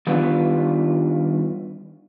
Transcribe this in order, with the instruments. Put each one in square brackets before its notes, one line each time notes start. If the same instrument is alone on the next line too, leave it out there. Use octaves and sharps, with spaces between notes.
[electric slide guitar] D#3 G3 B3 D4 F4 B4